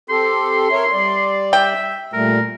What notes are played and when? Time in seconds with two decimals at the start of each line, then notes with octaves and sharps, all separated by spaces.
0.10 C4 G4 A4 C6
0.72 A#4 C#5 E5
0.92 G3 D5
1.53 E5 G5
2.13 A#2 G3 A3 A#4